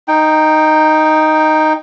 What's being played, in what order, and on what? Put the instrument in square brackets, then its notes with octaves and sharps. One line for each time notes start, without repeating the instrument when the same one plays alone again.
[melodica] D#4 G5